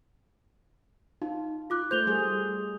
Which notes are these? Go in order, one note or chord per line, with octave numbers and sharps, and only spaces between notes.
D#4 F4
F4 D6 F#6
A3 C5 G6 F7 G7
G3 A3 G#4